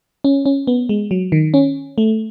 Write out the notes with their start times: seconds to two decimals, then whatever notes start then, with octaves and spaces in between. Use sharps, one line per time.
0.24 C#4
0.46 C#4
0.67 B3
0.89 G#3
1.11 F#3
1.32 D#3
1.54 C#4
1.98 A3